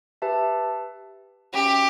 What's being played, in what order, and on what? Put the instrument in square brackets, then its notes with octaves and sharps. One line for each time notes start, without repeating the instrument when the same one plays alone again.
[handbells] G4 B4 E5 A5
[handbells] C#4 F#4 C#5 E5 [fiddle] G4